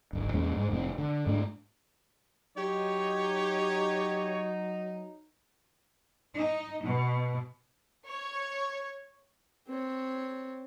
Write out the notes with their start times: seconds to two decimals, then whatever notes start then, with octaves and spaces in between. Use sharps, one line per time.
0.13 D1 G#1
0.33 E2 A#2 G#3 C#4
0.57 G#2 G#3
0.71 F1 A2 C4
0.98 D3
1.26 G#2 A3 D4
2.58 F#3 D#4 G4 C#5
6.38 D#4
6.84 B2
8.05 C#5
9.68 C4 C#5